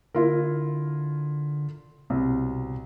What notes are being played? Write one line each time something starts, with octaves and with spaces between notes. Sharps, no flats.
D3 E4 F4 A#4
C2 B2